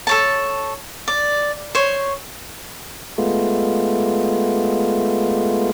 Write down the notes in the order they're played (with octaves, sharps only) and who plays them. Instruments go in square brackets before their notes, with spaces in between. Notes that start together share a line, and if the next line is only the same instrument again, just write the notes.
[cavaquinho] A4 C#5 A5
D5
C5 C#5
[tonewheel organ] G#3 A3 B3 F4